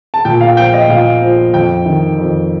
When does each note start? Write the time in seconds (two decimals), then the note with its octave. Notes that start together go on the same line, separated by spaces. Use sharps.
0.14 A5
0.25 A#2 G5
0.41 F5
0.56 F3 G5
0.74 D#5
0.89 A#2 F5
1.22 F3
1.53 F2 G5
1.86 D#3
2.19 F2